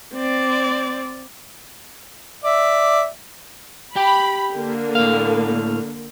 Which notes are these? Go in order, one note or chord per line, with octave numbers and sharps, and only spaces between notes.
C4 D5
D5 E5
G4 G5 B5
D3 A#3
A2 F5